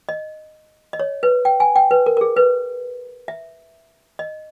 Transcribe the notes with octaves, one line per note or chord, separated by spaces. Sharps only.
D#5
D#5
C#5
B4
G5
G#5
G5
B4
A#4
A#4
G#4
B4
E5
D#5